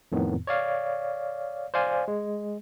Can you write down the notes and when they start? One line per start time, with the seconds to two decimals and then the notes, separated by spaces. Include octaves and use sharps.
0.12 F2 A2 D#3 B3
0.47 C#5 D5 F5
1.74 C5 D5 F5 G#5
2.08 G#3